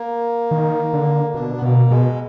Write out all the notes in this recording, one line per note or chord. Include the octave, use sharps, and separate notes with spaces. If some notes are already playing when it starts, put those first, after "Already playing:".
Already playing: A#3
D#3
D3
B2 D4
B3
B2 A#3
B2 G#3